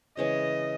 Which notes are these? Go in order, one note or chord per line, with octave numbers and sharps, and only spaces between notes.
C#3 E3 G#3 C#4 D#5